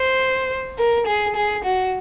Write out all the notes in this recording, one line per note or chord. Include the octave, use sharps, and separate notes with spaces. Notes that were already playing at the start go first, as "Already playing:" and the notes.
Already playing: C5
A#4
G#4
G#4
F#4